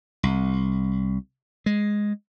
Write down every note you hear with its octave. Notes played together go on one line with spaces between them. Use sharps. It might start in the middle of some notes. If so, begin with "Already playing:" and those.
C2
G#3